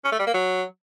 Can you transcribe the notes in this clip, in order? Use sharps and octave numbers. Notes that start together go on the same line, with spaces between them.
C#4
A3
G3
A#3
F#3